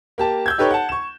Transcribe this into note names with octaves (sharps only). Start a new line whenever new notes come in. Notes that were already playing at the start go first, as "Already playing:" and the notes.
A#3 G4 A5
E6 G6 G#6
D#4 G4 A4 B4 C#5
F#5 A5
C#6 E7